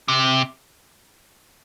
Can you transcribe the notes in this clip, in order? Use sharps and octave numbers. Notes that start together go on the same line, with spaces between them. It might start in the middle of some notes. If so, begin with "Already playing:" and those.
C3